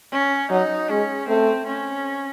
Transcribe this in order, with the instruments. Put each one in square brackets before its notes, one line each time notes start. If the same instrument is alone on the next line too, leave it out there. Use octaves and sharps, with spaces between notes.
[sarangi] C#4
[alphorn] F#3 [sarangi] D#4
[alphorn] G#3 [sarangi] C#4
[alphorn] A3 [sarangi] C4
[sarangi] C#4